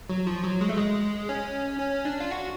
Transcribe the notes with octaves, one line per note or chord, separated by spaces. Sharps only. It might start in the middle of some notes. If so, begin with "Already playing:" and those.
F#3
F3
F#3
G#3
A3
G#3
C#4
C#4
D4
F4
F#4